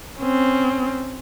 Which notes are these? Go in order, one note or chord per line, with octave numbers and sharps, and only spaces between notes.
C4 C#4